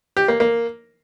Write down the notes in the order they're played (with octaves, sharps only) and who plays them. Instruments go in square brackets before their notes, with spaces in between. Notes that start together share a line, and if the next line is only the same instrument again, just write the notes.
[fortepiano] G4
A#3
A#3